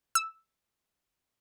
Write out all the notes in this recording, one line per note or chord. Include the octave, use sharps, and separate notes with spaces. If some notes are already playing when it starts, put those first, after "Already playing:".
E6